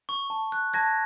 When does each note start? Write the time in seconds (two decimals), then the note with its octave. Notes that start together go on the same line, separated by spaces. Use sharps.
0.09 C#6
0.30 A5
0.52 F#6
0.74 A5 G#6 A#6